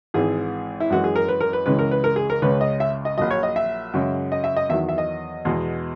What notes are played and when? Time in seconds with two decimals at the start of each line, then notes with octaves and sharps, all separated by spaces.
0.14 G#1 G#2 E3 G#4
0.80 E4
0.90 F#2 E3 G#3 F#4
1.04 G#4
1.16 A#4
1.28 B4
1.41 A#4
1.53 B4
1.66 C#2 C#3 E3 G#3 B4
1.79 A#4
1.91 B4
2.04 A#4
2.16 G#4
2.30 A#4
2.42 C#2 C#3 G#3 B4
2.61 D#5
2.80 E5
3.05 D#5
3.18 A#1 A#2 F#3 D#5
3.31 C#5
3.43 D#5
3.56 E5
3.94 F#2 C#3 G#3
4.32 D#5
4.44 E5
4.57 D#5
4.69 E2 D#3 F#3 E5
4.89 E5
4.98 D#5
5.45 E2 B2 G#3